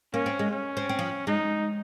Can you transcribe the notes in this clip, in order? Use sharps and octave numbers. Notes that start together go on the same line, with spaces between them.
A#3 C#4
C4
G#3
C#4
C4
C4
F3
G#3 D#4